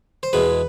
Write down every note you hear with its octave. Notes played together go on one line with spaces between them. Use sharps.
C5
E2 B2 G#3 B4